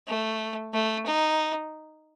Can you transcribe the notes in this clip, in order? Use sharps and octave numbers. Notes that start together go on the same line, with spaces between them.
A3
A3
D#4